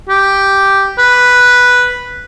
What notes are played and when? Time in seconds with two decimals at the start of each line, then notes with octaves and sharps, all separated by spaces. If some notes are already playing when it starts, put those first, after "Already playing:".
0.09 G4
0.98 B4